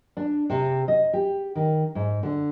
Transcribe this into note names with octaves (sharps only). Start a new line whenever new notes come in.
D4
C3
D#5
G4
D#3
G#2
D3